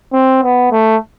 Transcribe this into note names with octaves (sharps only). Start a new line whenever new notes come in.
C4
B3
A3